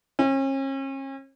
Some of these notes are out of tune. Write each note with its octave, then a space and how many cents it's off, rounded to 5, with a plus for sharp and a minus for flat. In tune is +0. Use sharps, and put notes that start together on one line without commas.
C#4 -40